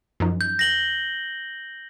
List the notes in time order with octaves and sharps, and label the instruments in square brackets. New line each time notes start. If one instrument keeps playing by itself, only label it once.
[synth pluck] F#2 F3 D#4
[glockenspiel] G6
A#6 F#7 G7